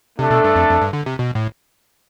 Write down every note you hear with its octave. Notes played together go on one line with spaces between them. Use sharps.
C3 A3 D4 A4
B2
G2
F2
F2
G2
D3
C3
B2
A2